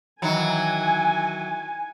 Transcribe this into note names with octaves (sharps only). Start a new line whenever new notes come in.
D#3 E3 F#3 G#5